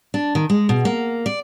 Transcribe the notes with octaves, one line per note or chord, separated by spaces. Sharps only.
D4
D#3
G#3
B2
A#3
D5